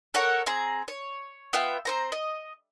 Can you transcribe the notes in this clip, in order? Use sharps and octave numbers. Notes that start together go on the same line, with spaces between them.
A4 A#4 C#5 F#5
C4 G#4 A#5
C#5
B3 F4 E5 G5
C4 C5 A#5
D#5